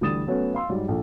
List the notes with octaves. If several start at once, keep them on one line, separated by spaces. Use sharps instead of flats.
D2 E3 G3 D#6 A6 E7
F#3 A3 B3 C#4
F5 C6 E6
G#2 F#3 G3
A#1 A4